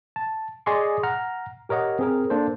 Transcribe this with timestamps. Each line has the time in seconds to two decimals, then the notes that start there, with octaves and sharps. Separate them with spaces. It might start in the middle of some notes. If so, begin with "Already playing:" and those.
0.16 A5
0.66 G#4 D5 D#5 G#5 C6 C#6
1.03 F#5 A#5 F6
1.69 G4 A#4 C#5 D#5 F#5
1.99 C4 G#4 A#4
2.30 A#3 D4 A4 C5